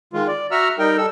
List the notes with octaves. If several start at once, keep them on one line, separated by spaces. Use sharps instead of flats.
D#3 G#3 F4
D5
F#4 E5 F#5 A#5 E6 F6
G3 D#4 A#4 G5
G3 A4 E6